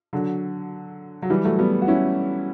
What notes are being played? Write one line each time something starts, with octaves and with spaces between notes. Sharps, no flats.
D3 F#3
F#3
E3 G3
F#3 A3
G3 B3
F#4
C#4 E4